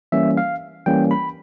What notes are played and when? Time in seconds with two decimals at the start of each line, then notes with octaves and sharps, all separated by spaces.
0.12 E3 G3 A#3 C#4 E5
0.37 F5
0.86 E3 G3 A#3 C#4 G5
1.11 B5